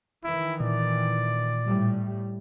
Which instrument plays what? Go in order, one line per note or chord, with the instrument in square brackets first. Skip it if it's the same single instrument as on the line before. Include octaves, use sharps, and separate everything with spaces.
[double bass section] D#3 E3 [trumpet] E4
[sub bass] A#2 [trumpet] D5
[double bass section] A2 G3